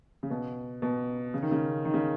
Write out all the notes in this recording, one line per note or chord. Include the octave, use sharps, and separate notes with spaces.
C#3
B2
B2
C#3
D#3
C#3
D#3
C#3